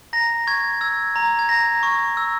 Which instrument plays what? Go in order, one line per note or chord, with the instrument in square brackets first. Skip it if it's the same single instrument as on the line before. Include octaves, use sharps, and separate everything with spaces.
[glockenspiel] A#5 A#6
C#6 G#6
E6 G#6
A#5
G#6
A#5 A#6
C#6
E6